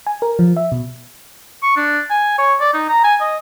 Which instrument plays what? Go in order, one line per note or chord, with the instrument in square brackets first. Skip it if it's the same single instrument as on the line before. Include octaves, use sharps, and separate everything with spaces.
[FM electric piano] G#5
A#4
F3
E5
B2
[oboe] C#6
D4
G#5
C#5
D5
D#4
A#5
G#5
D#5